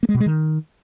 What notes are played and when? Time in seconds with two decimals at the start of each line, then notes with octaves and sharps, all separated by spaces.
0.03 A#3
0.09 G#3
0.14 B2
0.20 G#3
0.26 D#3